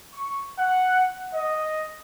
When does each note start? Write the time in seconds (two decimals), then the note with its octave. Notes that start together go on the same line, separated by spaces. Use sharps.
0.13 C#6
0.59 F#5
1.34 D#5